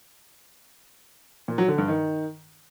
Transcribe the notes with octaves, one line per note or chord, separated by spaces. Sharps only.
A#2
F#3
D3
G2
D#3